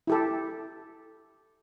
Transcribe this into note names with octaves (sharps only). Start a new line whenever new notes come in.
E4 G4 A4